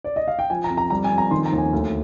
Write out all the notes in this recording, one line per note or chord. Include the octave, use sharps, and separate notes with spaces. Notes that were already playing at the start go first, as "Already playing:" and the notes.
D5
D#5
F5
G5
F3 G#5
A#5
F2
A#5
G3 A#5
G#5
F2
A#5
D#3 C6
A#5
D#2
G#5
D2